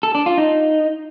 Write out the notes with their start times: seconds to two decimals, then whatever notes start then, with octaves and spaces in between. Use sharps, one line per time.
0.03 A4
0.15 D4
0.26 F4
0.38 D#4